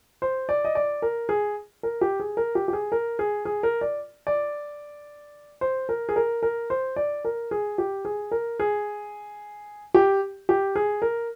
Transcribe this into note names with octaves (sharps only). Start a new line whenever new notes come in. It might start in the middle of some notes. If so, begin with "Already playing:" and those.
C5
D5
D#5
D5
A#4
G#4
A#4
G4
G#4
A#4
G4
G4
G#4
A#4
G#4
G#4
A#4
D5
D5
C5
A#4
G#4
A#4
A#4
C5
D5
A#4
G#4
G4
G#4
A#4
G#4
G4
G4
G#4
A#4